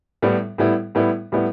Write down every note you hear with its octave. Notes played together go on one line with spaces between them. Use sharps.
A2 G3 B3 E4
A2 G3 B3 E4
A2 G3 B3 E4
A2 G3 B3 E4